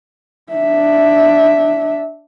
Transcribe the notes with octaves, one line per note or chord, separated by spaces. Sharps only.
D4 E5